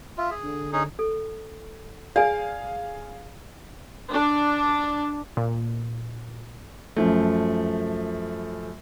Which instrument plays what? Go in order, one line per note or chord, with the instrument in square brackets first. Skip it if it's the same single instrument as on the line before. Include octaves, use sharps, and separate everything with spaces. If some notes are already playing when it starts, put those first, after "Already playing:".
[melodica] F4 [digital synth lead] E5
[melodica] G#4
[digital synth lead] D3
[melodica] C#4 D#4 G#4
[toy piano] A4
[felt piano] G#4 F5 [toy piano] D5 G#5
[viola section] D4
[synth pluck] A#2
[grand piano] F#2 F3 A3